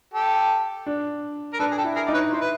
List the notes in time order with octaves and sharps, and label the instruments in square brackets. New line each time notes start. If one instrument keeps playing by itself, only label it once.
[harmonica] G4 A4
[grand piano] D4
[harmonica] A#4
[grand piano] D4 [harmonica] A4 B4
[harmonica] G#4
G4 A4
[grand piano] E4
[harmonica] G#4 A#4
[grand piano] D#4 [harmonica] D5
[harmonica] B4 C#5
[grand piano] E4 [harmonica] C5
[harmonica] B4